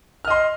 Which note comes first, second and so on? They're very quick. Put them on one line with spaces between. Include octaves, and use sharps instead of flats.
F6 D#5 C6